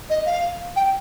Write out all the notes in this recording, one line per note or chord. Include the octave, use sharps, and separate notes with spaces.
D#5
F5
G5